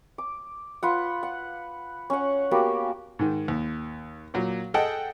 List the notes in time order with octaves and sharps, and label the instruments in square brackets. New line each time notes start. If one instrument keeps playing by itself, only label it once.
[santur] D6
F4 B4 F#5
F#5
C#4 F#5
A#3 B3 F#4 G4
[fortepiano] G#2 D#3
D#2
A#2 F#3
G#4 A4 D#5 F#5 G5 A5